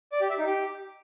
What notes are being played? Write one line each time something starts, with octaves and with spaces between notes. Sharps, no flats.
D5
G4
E5
D#4
G4